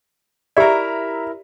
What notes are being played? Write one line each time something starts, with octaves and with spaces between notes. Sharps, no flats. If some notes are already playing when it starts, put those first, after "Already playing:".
E4 G4 A#4 D5 E5 A#5